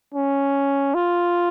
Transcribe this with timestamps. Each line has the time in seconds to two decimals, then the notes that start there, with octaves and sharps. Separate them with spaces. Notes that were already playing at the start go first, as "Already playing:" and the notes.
0.14 C#4
0.95 F4